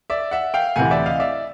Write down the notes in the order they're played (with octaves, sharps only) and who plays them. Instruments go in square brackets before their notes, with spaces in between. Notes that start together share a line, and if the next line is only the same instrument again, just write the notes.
[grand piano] D5 E5
E5 F#5
F5 G5
D2 C3 E3 F#5 G#5
D5 E5
D#5 F5
D5 E5